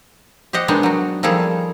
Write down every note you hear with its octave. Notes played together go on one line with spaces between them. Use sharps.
G4 C5 D#5 F#5
D#3 G#3 B3 D4 C5
F#3 F#4
D#3 F3 G3 G#4 A4